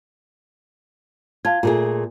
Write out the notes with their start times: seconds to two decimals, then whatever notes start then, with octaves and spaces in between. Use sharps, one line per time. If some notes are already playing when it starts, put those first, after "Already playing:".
1.45 F4 F5 A5 G#6
1.63 A#2 A3 F4 G#4